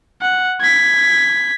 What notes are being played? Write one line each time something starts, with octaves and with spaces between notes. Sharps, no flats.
F#5
G#6 B6